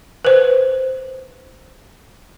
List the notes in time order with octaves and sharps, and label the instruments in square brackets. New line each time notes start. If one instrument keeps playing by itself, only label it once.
[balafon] B4 C5